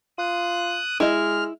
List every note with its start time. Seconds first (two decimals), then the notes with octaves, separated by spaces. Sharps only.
0.18 F4 D#6 F#6
1.00 G#3 E4 D#5 F6